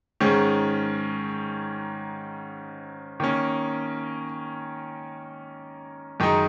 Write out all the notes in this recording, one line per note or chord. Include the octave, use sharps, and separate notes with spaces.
G#2 D#3 G#3 C#4
D#3 A#3 C#4
F#2 D#3 G#3 D#4